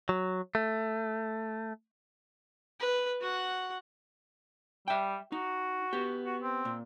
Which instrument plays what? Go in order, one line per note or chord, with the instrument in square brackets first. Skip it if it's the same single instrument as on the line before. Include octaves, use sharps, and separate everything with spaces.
[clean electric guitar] F#3
A3
[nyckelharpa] B4
F#4 F#5
[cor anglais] G3 [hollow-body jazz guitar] E5 G5
[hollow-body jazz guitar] D#4 [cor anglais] F#4
[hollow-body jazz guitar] B3 G4
[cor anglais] F#4
C4
[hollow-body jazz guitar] A#2